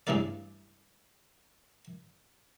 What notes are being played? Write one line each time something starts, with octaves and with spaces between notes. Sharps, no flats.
G2 C#3 E3 A3 A4 D5